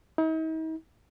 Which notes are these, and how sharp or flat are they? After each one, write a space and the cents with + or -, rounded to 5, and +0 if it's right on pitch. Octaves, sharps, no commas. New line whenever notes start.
D#4 +45